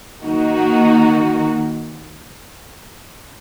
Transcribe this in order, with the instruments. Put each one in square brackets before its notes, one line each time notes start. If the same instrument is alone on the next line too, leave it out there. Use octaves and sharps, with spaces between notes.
[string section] D#3 A#3 D#4 F#4